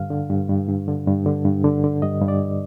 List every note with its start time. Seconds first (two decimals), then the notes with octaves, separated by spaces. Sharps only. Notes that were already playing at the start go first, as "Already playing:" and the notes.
Already playing: G2 D3 F5
0.10 D3
0.30 G2
0.49 G2
0.68 G2
0.88 D3
1.07 G2
1.26 D3
1.45 G2
1.64 D3
1.84 D3
2.02 G2 D#5
2.21 G2
2.28 D5